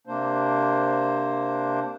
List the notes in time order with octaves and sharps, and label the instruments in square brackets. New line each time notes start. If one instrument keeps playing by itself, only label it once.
[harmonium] C3 A#3 D4 C5